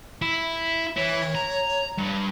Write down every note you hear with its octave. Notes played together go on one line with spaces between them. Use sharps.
E4
E3 E4 C#5
A#5
G2